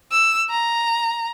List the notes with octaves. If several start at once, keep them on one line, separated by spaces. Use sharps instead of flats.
E6
A#5